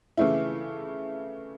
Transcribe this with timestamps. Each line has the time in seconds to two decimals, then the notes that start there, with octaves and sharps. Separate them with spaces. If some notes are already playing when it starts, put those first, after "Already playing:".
0.17 C#3 E3 A3 E4